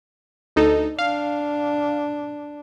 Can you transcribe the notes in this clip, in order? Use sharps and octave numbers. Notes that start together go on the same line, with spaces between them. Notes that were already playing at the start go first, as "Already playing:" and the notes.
D2 D#4 A4
D4 F5